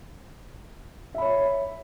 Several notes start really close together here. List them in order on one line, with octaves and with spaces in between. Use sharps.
E5 B5 C#5